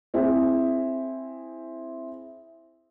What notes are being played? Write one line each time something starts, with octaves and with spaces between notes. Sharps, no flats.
C4 E4 G#4